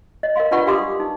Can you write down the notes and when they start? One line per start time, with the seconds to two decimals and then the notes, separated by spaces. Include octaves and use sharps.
0.23 D#5
0.36 A#4 D#5 F5 C6
0.51 D4 F4 B4 D5 F#5 C#6
0.66 D4 G4 F5 C6 D6 D#6
1.00 D#4